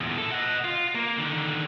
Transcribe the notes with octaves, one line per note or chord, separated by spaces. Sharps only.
E2 A#2
E4 A4
D#5 F#5
F4
A#3
D3 D#3